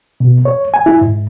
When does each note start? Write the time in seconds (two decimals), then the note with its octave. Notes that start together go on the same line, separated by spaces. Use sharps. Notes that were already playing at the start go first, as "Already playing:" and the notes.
0.20 B2
0.45 C#5
0.74 G#5
0.86 E4
1.01 G#2